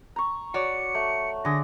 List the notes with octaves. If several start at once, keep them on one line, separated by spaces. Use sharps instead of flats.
A#5 C#6
F#4 C#5 D5 C#7
A3
D3 G#4 D6 A#6